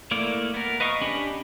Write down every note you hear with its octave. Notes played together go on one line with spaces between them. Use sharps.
A3 A#3 E4 D5
B3 A#4
B4 D#5 F5 C#6
C#4 D4 G4 D#5 B5